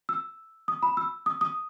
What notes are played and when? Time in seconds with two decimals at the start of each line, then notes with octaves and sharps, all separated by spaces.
0.09 E6
0.68 D#6
0.83 B5
0.97 E6
1.26 D#6
1.41 D#6